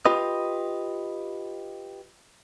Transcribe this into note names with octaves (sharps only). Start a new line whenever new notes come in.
F4 G4 B4 D#5